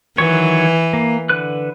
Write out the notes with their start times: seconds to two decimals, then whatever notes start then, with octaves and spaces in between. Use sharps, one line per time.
0.18 D#3 E3 F#3 C#5
0.93 A#3
1.29 D3 B4 F#6